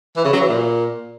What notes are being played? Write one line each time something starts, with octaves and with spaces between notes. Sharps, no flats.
E3
C#3
F#3
E3
A#2